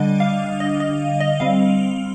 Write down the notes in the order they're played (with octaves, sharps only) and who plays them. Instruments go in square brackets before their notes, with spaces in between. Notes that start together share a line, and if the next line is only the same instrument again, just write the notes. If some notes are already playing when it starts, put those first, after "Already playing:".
Already playing: [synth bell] D3 G3 D4 D#5
F5
D#5
D#5
D#5
G3 C4 F5